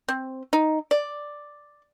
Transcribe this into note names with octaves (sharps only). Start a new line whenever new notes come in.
C4
D#4
D5